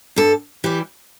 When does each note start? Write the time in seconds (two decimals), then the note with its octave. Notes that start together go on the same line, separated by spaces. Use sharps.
0.16 G2 A4
0.64 E3 G3 G4